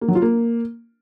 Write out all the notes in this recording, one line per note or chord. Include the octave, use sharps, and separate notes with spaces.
A#3
F#3
F4
A#3